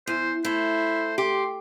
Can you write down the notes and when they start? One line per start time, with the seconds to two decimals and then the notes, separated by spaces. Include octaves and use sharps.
0.07 E2 C5
0.45 A3 E4 C5
1.18 G4 C6